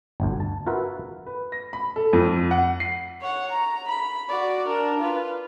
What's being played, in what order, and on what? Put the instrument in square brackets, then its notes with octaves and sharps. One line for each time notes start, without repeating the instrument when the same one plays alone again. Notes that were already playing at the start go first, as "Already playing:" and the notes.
[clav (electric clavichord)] G1 D2
A5
F4 F#4 A#4 B4 E5
[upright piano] B4
A#6
B5
A4
F2
F#5
C7
[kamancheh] C#5 F#5
A#5
B5
F#4 D5
D4 A#4
F4 B4